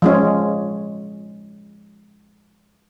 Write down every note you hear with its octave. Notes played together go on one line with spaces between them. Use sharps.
F3 G#3 C#4